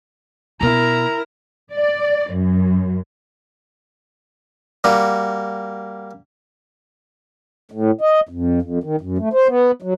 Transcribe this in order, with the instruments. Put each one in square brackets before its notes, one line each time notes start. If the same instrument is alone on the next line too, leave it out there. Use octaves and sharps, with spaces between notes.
[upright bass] B2 B3 [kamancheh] E4 A#4 [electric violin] A#5
[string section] D5
F#2
[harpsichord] G3 A#3 F#4
[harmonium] A2
D#5
F2
F2
D#3
F#2
A3
C5
B3
F#3